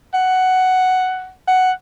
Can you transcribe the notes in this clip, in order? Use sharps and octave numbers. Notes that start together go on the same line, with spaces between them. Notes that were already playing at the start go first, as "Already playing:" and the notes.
F#5
F#5